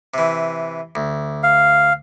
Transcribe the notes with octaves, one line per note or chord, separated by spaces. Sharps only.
C3 E3
D2
F5